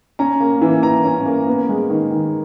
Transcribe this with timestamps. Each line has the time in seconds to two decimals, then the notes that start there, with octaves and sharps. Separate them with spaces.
0.19 C#4 A#5
0.40 A#3
0.62 E3
0.83 E3 A#5
1.04 C#4
1.26 A#3
1.47 B3
1.69 G#3
1.90 D#3
2.11 D#3